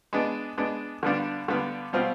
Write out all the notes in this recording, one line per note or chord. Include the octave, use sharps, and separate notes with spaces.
G#3 B3 D4
G#3 B3 D4
D3 G3 B3 D4 F4
D3 G3 B3 D4 F4
B2 G3 C4 F4